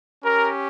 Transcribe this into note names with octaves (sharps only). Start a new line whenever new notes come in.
C#4 G4 A#4